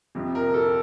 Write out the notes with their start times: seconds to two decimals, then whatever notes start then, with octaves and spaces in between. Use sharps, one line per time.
0.15 F2 C3 F3
0.35 A#4
0.54 A4